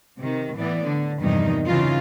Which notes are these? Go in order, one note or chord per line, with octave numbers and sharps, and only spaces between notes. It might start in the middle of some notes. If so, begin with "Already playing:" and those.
C3 D#3
A2 E3 B3 D5
D3
E2 G2 C3 D#3 F3 D#4
C#3 E3 D#4 F4